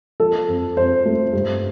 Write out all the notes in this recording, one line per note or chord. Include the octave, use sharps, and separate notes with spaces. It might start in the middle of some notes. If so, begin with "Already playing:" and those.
F3 A4
F2
F2 C5
A3
G2